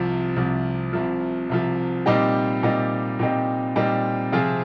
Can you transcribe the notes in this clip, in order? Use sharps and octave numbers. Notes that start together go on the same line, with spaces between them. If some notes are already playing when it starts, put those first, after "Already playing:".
Already playing: C2 C3 F3
C2 C3 F3
C2 C3 F3
C2 C3 F3
A#2 G3 C4 D#4 G4
A#2 G3 C4 D#4 G4
A#2 G3 C4 D#4 G4
A#2 G3 C4 D#4 G4
C3 F3 C4 F4 G#4